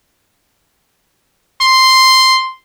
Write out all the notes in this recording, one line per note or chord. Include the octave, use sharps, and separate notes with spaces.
C6